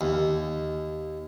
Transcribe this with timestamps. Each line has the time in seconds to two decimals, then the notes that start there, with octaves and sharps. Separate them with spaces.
0.01 D#2